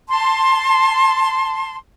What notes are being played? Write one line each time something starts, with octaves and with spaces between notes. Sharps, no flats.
A5 C6